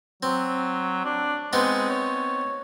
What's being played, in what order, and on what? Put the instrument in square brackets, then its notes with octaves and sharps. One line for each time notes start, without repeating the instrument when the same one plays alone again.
[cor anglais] F#3 [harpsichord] C4
[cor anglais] D4
[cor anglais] G#3 [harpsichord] B3 C4 D#4
[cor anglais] C#5